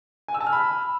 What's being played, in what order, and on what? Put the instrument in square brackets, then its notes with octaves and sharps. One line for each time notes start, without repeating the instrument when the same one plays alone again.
[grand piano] G#5
E6
A5
F6
B5